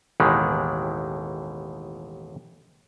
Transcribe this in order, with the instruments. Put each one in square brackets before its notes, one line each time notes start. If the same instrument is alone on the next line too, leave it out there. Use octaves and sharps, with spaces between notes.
[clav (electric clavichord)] A1 D#2 B2 D#3 E3 G#3